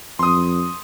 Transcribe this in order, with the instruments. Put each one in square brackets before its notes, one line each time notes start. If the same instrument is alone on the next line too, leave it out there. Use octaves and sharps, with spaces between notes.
[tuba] F2 [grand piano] C6 D#6